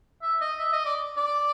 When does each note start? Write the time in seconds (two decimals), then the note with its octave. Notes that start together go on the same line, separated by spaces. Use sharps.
0.22 E5
0.41 D#5
0.59 E5
0.73 D#5
0.85 D5
1.17 D5